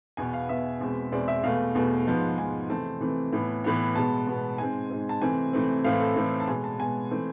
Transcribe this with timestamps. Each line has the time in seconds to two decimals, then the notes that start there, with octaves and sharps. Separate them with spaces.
0.17 E2 B2 B3 G#5
0.34 F5
0.49 E2 B2 B3 E5
0.81 E2 B2 G#3 C4
1.12 E2 B2 G#3 C4 D5
1.28 E5
1.44 E2 B2 A3 F5
1.75 E2 B2 A3
2.07 G#2 F3 B3
2.38 G#2 F3 B3 G#5
2.69 C3 E3 A3 C4 A5
3.00 C3 E3 A3 C4
3.33 A2 E3 B3
3.64 A2 E3 B3
3.95 B2 G#3 B3 A5
4.27 B2 G#3 B3
4.58 G#2 G#3 C4 G#5
4.90 G#2 G#3 C4
5.09 A5
5.22 C3 E3 A3 C4 G#5
5.53 C3 E3 A3 C4
5.84 A2 E3 A3 C4 F5
6.00 A4
6.16 A2 E3 A3 C4
6.40 A5
6.48 B2 G#3 B3 G#5
6.64 A5
6.79 B2 G#3 B3 G#5
7.11 E3 A3 C4